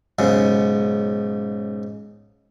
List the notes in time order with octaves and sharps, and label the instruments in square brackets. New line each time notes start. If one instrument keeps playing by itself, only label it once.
[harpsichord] B1 G#2 C#3